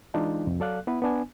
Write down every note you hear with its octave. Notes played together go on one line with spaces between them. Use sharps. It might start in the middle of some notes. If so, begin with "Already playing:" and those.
E3 G#3 D4 D#4 F4
C2 F2
F#3 A4 D5 F5 F#6
B3 E4 B4
B3 D4 G#5